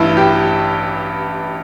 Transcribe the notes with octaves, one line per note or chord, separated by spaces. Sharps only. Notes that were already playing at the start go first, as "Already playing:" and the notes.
Already playing: A1 G2 E3 E4
G4